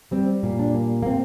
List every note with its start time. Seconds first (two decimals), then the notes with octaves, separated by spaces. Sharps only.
0.11 G3 C4
0.43 A#2
0.59 D4
0.74 A#3
1.02 A#3
1.06 A#2 C4